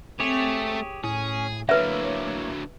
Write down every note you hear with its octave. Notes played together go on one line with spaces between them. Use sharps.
A3 C4 G4 G#4 C#5
A2 C#4 G#4
D3 F#3 A#3 E4 B4 C#5 E5